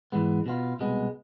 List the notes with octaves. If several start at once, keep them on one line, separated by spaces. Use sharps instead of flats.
G#2 E3 G#3 B3
B2 B3 F4
C2 B2 G#3 B3